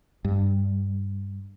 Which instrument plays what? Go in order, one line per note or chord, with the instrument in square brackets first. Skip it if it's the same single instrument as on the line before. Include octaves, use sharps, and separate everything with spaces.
[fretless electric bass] G2